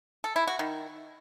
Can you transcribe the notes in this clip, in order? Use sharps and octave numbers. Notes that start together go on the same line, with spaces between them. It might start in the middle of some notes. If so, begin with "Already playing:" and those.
A4
E4
F#4
D#3